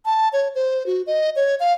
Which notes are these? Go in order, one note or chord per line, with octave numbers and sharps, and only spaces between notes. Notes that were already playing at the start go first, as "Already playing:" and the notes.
A5
C#5
C5
F#4
D#5
C#5
F5